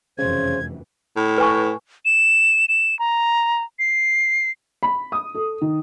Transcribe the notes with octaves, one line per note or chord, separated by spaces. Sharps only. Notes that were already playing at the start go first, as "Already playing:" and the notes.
F1 F#2 C#3 E3 C5 G#6
A2
B4 G#5 C#6
E7
E7
A#5
C7
B5
D#6
A4
D#3